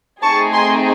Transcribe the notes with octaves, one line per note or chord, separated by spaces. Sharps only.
A3 C4 D#4 G#4 A5 C#6
G#5 C6